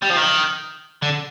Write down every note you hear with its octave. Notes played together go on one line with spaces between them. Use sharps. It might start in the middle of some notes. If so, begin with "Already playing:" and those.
G3
F3
D#3
D3